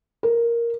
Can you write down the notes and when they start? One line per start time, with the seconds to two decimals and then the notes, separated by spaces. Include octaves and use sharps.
0.23 A#4